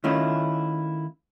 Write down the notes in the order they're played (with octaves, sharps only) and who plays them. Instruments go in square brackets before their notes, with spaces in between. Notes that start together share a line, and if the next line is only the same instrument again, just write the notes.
[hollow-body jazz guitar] D#3 A3 C#4 E4 F4